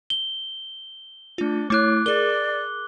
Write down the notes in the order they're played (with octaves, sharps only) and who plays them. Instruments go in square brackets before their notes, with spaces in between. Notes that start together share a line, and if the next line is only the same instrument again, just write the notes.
[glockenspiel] G7
[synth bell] A3 F4 [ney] D4
[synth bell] A3 E4 [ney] C#5 [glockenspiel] D6 F#6
[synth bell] G#4 A#4 [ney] D5 [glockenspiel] G7